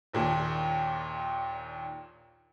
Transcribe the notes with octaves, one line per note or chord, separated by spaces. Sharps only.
A#1 D#2 A#2